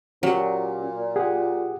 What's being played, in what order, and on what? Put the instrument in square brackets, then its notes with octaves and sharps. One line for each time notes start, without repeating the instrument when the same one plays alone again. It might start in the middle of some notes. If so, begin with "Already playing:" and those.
[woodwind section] A#2 [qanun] F#3 [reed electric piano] C#4 G4
[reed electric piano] G4 G#4 F#5